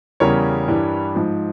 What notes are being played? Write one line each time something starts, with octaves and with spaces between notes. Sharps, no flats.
E2 C#3 G3 A#4 C#5
G2 E3 G3
G#2 F3